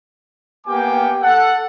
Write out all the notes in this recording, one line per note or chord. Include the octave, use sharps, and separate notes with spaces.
A#3 B3 G4 G5 G#5 D6
A4 F#5